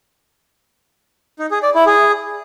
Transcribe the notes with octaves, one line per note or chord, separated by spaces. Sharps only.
D#4
G#4
D5
E4
G#4